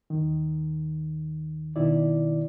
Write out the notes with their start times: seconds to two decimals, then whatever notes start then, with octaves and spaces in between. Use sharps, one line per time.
0.10 D#2 D#3
1.76 B2 D#3 E4 D5